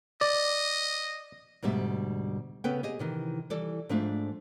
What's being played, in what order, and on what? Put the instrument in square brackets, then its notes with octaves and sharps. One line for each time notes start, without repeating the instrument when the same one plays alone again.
[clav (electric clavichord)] D5 [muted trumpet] D#5
[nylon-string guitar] D2 G#2 B2 G3 E5
C#3 B3 C#4 A4 B4 G5
G4 G#4 D#5
C3 D#3 E3
E3 G3 A4 D5
G#2 F3 A3 D4 F4 E5